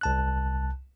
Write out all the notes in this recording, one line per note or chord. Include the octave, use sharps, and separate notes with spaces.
C2 A5 F#6